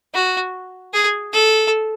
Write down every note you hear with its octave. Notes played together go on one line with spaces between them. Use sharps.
F#4
G#4
A4